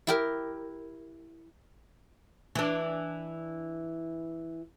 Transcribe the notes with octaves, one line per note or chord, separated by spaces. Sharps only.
E4 G4 A#4
E3 D4